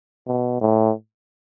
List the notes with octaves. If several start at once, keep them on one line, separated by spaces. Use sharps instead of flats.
B2
A2